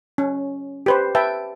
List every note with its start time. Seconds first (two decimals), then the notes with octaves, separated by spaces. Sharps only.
0.18 C#4
0.86 G4 B4 C5
1.15 B4 E5 G5 A5